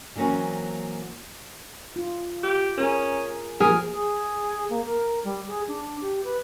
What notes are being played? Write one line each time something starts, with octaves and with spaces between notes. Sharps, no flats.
E3 F#3 A#3 C4 C#4
F4
G4
C#4 G#4 A#4
F3 A#3 G#4 A#4
G#4
A#3
A#4
G3
G#4
D4
G4
B4